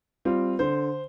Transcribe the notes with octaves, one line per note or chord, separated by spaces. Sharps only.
G3 C4 F4
D3 C5